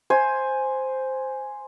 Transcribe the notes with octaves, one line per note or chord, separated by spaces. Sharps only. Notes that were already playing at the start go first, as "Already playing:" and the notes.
C5 G#5